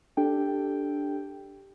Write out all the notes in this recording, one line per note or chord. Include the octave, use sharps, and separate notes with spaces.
D4 G4 A4 G5